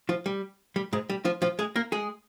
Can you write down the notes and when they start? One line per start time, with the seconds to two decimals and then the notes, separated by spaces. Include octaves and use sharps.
0.09 F3 F4
0.26 G3
0.76 G3
0.93 G#2 G#3
1.10 G3
1.25 F3 F4
1.42 F3 F4
1.59 G#3 G#4
1.76 A#3 A#4
1.92 G#3 G#4